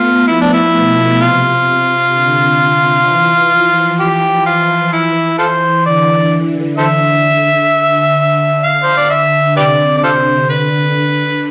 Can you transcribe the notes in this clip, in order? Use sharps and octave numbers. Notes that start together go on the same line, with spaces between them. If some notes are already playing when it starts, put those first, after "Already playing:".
Already playing: A3 B3 F4
F3 E4
D4
E4
B2
C3 F4
C3
D3
E3
F3
E3 G4
F4
E4
F4 A4 C5
D3 D5
A4 C5 E5
D3
F5
C5
D5
E5
C3 G4 B4 D5
D5
C3 F4 A4 C5
D3 B4
D3